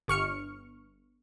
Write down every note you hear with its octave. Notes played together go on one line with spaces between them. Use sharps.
G1 C#6 F6 C#7